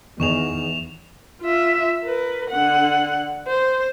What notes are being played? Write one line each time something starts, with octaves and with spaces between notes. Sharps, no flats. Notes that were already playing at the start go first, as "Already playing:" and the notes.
E2 D#3 D#4 G#4 C#6 E7 F7
F4 E5
A#4 B4
D3 F#5
C5